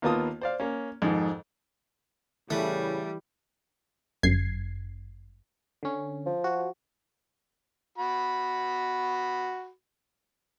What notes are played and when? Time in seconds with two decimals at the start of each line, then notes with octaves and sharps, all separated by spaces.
0.02 D#2 A#3 B3 F4 A5 D#6
0.41 C5 D5 F5
0.60 A#3 C#4
1.02 F2 G#2 D#3
2.50 A2 C#3 E3 G3 A3 B4
4.23 G1 F#2 G#6 C7
5.83 D3 C#4
6.26 F3
6.44 F#4
7.98 F#4 B5